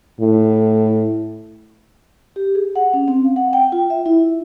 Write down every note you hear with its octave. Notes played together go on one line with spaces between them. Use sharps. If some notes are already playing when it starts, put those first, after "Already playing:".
A2
G4
G#4
F#5
C#4
C4
F5
F#5
G5
F4
E5
E4